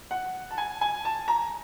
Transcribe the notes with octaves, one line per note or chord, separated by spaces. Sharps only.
F#5
A5
G#5
G#5
A5
A#5